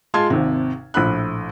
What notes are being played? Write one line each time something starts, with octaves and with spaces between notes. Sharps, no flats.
G#3 F4 A5 C6 G#6
G#1 D#2 C3
A#1 A2 B5 F#6